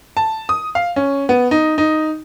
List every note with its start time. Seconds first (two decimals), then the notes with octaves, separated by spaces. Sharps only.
0.17 A5
0.49 D#6
0.75 F5
0.96 C#4
1.29 B3
1.51 D#4
1.78 D#4